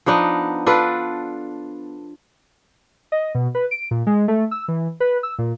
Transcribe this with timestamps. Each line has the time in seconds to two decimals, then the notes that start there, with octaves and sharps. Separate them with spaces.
0.06 F3 B3 D4 D#4
0.67 D4 F4 A4 B4
3.12 D#5
3.35 B2
3.55 B4
3.71 D7
3.91 A#2
4.07 G#3
4.28 A3
4.51 E6
4.68 E3
5.00 B4
5.23 E6
5.38 A#2